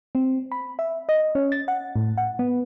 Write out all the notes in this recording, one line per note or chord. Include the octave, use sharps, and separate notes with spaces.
C4
B5
E5
D#5
C#4
A6
F#5
A2
F#5
B3